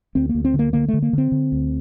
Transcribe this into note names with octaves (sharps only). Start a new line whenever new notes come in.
D2 C4
A#3
D2
C4
D3
A#3
D3 A#3
A3
D3
A#3
D3 C4
D3
D2